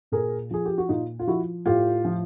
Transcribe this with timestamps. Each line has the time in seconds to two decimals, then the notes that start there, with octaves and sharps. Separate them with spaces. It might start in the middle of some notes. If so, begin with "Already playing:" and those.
0.12 A#2 G#4 A#4
0.51 F3 G#4
0.66 G4
0.78 F#4
0.89 A#2 D#4 F4
1.19 F4
1.27 F3 E4 F#4
1.66 A2 F4 G4
2.05 F3